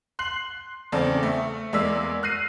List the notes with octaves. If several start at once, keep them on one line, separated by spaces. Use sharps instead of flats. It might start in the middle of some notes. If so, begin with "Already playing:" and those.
C6 F#6 C7 F#7
E2 C#3 C4 A4 D5
A3
E2 G#3 A#3 D5 E6 B6
F6 F#6 A#6 C7 D#7